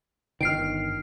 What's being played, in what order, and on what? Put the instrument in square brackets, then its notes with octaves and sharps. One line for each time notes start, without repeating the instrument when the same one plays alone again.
[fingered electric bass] G1 D#3 [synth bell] F6 C7 D7